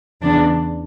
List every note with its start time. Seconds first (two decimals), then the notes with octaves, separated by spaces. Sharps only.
0.22 E2 C#3 E3 D4